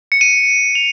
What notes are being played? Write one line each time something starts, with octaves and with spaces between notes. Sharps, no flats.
C#7
D#7
F7